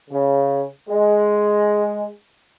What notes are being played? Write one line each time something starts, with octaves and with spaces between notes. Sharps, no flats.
C#3
G#3